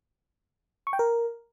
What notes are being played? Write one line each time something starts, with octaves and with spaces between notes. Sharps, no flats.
C#6
G5
A#4